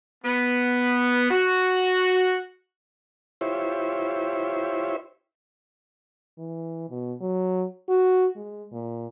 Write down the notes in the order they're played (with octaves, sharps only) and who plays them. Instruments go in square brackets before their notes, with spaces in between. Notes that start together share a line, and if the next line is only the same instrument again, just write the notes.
[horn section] B3
F#4
[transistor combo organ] E4 F4 G4 C5 C#5 E5
[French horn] E3
B2
F#3
F#4
G#3
A#2